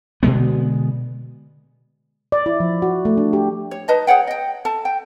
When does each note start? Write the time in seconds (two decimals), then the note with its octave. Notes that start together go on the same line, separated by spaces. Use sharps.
0.23 B2 D3 G#3 B3
2.32 D5
2.46 E4
2.60 F3
2.82 F#4
3.05 A3
3.17 D4
3.33 G4
3.71 C#5
3.88 D#4 B4 D#5 A5
4.07 G#4 C#5 F#5 G5
4.27 D#5 G5
4.65 A4 A5
4.85 G5